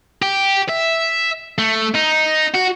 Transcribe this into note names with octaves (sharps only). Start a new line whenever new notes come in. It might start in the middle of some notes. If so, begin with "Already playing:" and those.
G4
E5
A3
D#4
F#4